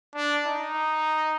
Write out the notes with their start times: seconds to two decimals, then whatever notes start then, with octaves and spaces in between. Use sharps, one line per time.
0.15 D4
0.46 D#4